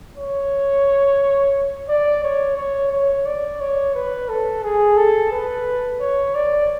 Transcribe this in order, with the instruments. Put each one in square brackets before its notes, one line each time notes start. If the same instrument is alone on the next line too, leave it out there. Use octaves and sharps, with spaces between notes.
[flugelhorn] C#5
D5
C#5
C#5
C#5
D5
C#5
B4
A4
G#4
A4
B4
C#5
D5